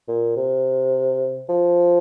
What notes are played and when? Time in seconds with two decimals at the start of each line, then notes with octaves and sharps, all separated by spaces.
0.08 A#2
0.37 C3
1.49 F3